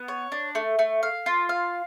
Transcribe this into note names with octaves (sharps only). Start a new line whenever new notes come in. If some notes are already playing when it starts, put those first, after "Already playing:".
Already playing: B3
C#5
D4
A3
A3
F5
F4
F5